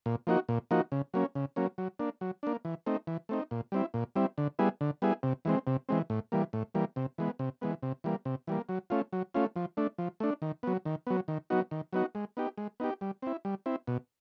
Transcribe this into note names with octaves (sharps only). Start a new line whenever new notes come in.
A#2
F3 A#3 D#4 F#4
A#2
F3 A#3 D#4 F#4
C#3
F#3 A#3 C#4
C#3
F#3 A#3 C#4
F#3
A#3 D4
F#3
A#3 D4
E3
A3 C4 D#4
E3
A3 C4 D#4
A#2
G3 C4 E4
A#2
G3 C4 E4
D3
G3 B3 E4 G#4
D3
G3 B3 E4 G#4
C3
E3 G#3 C4
C3
E3 G#3 C4
A2
E3 G3 A#3
A2
E3 G3 A#3
C3
E3 G#3 B3
C3
E3 G#3 B3
C3
E3 G3 A#3
C3
E3 G3 A#3
F#3
A3 C#4 F4
F#3
A3 C#4 F4
F3
A3 D4
F3
A3 D4
D#3
F#3 B3
D#3
F#3 B3
D#3
F#3 B3 D#4 F#4
D#3
F#3 B3 D#4 F#4
G#3
B3 D#4 G4
G#3
B3 D#4 G4
G3
C4 E4
G3
C4 E4
B2